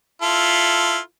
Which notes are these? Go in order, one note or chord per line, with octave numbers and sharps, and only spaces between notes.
E4 F4 A4